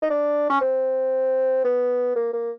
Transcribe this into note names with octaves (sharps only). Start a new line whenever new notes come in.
D#4
D4
C#4
C4
B3
A#3
A#3